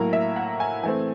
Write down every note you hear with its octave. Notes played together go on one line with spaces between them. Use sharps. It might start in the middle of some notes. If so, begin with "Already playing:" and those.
Already playing: A2 F#3 A#3 A#4
E5
F#5
G#5
E3 A3 C4 G#5